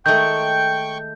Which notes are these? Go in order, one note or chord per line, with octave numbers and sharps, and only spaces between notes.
D#3 G#3 A3 G5 C#6 G6